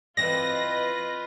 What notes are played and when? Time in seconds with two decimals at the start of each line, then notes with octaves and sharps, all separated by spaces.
0.17 E3 C4 F4 B4 D5 D#5 A#6